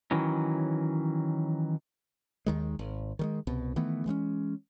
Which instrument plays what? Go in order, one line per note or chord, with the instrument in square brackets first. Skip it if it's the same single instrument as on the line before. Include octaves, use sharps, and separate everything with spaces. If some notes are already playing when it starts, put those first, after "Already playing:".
[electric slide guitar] D#3 E3 F#3 C#4
[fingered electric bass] D#2 D#3 G#3
G#1
D#3 G3 G#3
C2 B2
D#3 E3 A3 B3
E3 G#3 B3 C#4